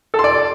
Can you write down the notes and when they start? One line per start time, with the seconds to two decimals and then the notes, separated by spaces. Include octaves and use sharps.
0.14 A4
0.19 C6
0.24 D5